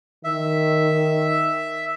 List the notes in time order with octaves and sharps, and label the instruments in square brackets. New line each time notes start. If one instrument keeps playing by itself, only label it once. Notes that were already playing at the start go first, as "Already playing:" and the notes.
[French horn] D#3 [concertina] E5